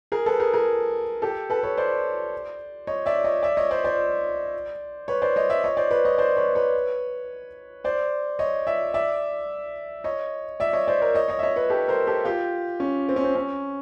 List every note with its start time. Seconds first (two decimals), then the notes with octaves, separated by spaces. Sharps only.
0.12 G#4 A#4
0.26 A4 B4
0.40 G#4 A#4
0.53 G#4 A#4
1.22 G4 A4
1.50 A4 B4
1.63 B4 C#5
1.77 C5 D5
2.87 C#5 D#5
3.06 D5 E5
3.24 C#5 D#5
3.43 D5 E5
3.57 C#5 D#5
3.71 C5 D5
3.84 C5 D5
5.08 B4 C#5
5.22 C5 D5
5.36 C#5 D#5
5.50 D5 E5
5.64 C#5 D#5
5.77 C5 D5
5.91 B4 C#5
6.05 C#5 D#5
6.18 C5 D5
6.37 B4 C#5
6.55 B4 C#5
7.84 C5 D5
8.39 C#5 D#5
8.67 D5 E5
8.94 D5 E5
10.04 C#5 D#5
10.60 D5 E5
10.73 C#5 D#5
10.88 C5 D5
11.02 A#4 C5
11.15 C#5 D#5
11.28 C#5 D#5
11.39 E5
11.43 C#5 D#5
11.56 B4 C#5
11.70 G4 A4
11.88 A#4 C5
12.07 G4 A4
12.25 F4 G4
12.80 C#4
13.09 C4
13.16 C#4
13.24 C4
13.35 C#4